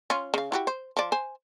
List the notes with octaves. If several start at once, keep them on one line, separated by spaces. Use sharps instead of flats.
C#4 F4
C#3 F5
E4 F#4 G4
C5
F3 D5
C5 G#5